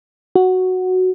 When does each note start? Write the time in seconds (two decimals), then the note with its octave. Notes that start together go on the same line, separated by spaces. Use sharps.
0.35 F#4